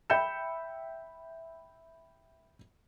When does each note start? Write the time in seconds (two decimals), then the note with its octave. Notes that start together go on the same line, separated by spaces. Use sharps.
0.10 E5 G5 B5 G6 C#7 E7